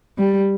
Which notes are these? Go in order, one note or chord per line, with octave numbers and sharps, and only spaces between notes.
G3